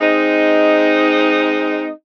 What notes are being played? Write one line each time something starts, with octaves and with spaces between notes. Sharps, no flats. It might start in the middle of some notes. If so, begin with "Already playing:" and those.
G#3 C4 D#4